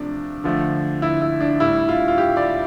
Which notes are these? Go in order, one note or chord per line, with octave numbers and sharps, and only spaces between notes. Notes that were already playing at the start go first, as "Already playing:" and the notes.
Already playing: C3 F3 A3 D4
D3 F3 A3
E4
E4
D4
A2 G3 E4
F4
F4
G4
D5